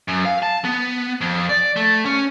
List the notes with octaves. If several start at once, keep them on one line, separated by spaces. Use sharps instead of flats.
F#2
F5
A5
B3
F2
D5
A3
C#4